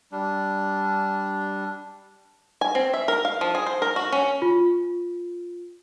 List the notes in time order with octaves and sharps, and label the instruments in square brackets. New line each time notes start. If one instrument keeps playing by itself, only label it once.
[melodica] G3 D4
[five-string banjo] G#5
C4
E5
A#4
F5
F3
G#4
C5
A#4
F#4
C#4
[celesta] F4